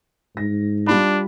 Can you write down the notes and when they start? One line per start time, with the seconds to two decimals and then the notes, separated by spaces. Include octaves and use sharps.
0.37 G#2 A#6
0.87 G3 D4 F4 B5